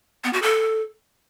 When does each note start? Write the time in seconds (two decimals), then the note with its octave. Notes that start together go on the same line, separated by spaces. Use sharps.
0.24 B3
0.33 F#4
0.42 A4